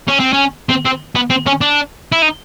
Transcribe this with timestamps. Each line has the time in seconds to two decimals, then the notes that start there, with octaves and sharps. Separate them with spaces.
0.09 C#4
0.20 C4
0.33 C#4
0.69 C4
0.85 C4
1.15 B3
1.30 C4
1.47 C#4
1.61 D4
2.12 E4
2.22 D#4